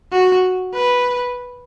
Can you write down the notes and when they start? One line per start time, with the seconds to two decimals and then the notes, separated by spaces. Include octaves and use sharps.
0.12 F#4
0.75 B4